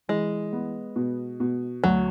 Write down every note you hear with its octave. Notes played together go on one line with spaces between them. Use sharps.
E3 G#3
B3
B2
B2
D2 F#3